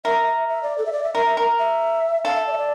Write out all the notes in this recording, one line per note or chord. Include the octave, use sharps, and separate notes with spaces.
A#4 E5
E5
E5
D5
A4
E5
D5
E5
A#4 E5
E5
A#4
E5
A4 F5
E5
D5
E5
D5